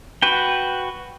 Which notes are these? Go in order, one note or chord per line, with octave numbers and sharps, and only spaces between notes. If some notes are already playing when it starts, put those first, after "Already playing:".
F#4 B4 G5